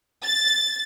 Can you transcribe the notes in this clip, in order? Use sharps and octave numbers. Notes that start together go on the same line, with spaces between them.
A6